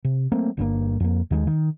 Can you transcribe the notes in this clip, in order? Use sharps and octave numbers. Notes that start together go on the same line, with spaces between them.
C3
F#3 A3 A#3 C4
G1 G2 A#2 A#3
F2 A#3
D#2 D#3 E3 G#3
D#3